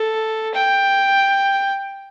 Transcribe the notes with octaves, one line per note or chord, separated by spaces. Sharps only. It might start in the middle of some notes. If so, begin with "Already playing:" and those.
Already playing: A4
G5